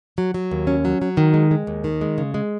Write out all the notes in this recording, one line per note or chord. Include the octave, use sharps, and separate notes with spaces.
F#3
F#3
D#2
C#4
F#3
F#3
D#3
G#3
G#3
D#2
D#3
G#3
C#3
G#3